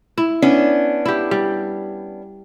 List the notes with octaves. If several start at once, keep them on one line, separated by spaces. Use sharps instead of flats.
E4
B3 C#4 D4
E4 G4
G3